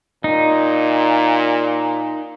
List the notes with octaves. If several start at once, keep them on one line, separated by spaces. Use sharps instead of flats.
A#2 D#4